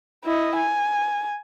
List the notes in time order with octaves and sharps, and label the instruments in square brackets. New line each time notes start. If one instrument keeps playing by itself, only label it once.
[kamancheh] E4 D#5
G#5